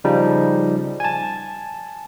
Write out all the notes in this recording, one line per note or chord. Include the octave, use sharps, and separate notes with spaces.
C#3 F3 G3 D#4
G#5 A5